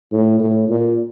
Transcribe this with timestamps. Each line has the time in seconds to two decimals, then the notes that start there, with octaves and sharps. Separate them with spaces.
0.12 A2
0.40 A2
0.69 A#2